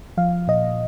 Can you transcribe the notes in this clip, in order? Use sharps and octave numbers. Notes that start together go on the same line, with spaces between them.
F3 F5
A#2 D#5